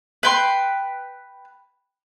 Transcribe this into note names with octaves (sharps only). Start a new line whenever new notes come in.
B4 G5 C6